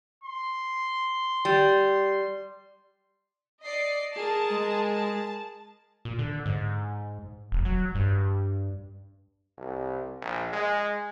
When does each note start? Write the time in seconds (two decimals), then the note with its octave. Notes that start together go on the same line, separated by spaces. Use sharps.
0.24 C6
1.45 G3
3.64 D5 D#5 C7
4.17 G#4 A#4 A5
4.50 G#3
4.94 A5
6.05 A#2
6.19 D3
6.46 G#2
7.52 F1
7.65 F#3
7.95 G2
9.58 C2
10.21 A#1
10.53 G#3